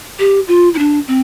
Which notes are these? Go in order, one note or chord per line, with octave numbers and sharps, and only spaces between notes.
G4
F4
E4
D4
C4